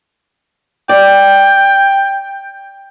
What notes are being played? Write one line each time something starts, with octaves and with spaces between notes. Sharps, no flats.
D5 G5